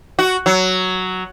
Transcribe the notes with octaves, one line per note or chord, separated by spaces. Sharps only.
F#4
F#3